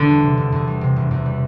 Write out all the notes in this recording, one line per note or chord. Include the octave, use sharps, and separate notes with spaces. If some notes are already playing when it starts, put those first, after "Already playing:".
Already playing: E1 E2 D3
G3
C3
E1
E2
G3
C3
E1
E2
G3